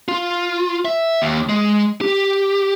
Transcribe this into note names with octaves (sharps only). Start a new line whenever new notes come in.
F4
E5
D#2
G#3
G4